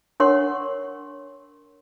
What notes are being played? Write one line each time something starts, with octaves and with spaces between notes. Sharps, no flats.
D4 A#4 C#5 F#5 C6 C#6